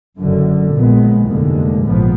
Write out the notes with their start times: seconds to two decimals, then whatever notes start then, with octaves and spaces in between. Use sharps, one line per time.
0.18 F#1 F#2 D3
0.74 A#1 A#2 G#3 B3
1.30 F1 D#2 D3 G#3
1.85 A#1 G#2 F3 B3